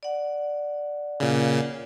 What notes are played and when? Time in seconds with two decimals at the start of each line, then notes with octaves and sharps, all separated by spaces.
0.03 D5 F#5
1.20 A#2 C#3